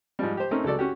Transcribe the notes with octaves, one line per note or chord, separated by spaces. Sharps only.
G#2 F3 G3
G4 C5
A3 C4 C#4 D#4 A#4
C#2 F#3 A4 D5
C#4 F#4 G4